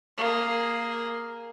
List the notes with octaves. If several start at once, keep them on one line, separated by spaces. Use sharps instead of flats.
A#3 G#4